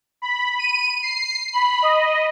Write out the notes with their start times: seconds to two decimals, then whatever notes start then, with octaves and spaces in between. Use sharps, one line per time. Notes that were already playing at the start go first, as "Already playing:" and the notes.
0.22 B5
0.59 D#7
1.02 C7
1.53 B5
1.82 D#5